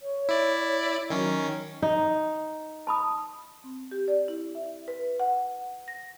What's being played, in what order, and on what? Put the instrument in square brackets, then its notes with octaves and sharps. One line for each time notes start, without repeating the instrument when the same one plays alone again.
[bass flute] C#5
[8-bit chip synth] E4 D5
[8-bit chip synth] D#3 C#4 [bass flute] F#3
[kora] D#4
[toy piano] A5 B5 D#6
[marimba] C4
G4
D5
E4
E5
B4
F#5
A#6